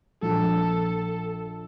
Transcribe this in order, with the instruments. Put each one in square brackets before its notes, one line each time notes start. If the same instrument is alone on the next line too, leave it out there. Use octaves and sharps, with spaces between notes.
[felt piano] A#1 [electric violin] A4